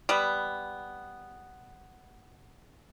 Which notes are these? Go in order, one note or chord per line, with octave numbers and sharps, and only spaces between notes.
G3 B3